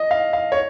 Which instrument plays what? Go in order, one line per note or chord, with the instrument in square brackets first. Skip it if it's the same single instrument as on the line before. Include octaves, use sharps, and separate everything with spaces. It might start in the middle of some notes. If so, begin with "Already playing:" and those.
Already playing: [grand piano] D#5
F5
F5
C#5